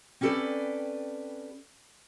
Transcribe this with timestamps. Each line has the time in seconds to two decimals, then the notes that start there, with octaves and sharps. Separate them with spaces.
0.21 C4 C#4 G4 A4 B4 D5